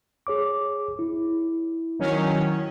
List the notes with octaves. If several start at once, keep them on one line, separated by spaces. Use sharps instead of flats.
G#4 C#5 D6
E4
D#3 F#3 C#4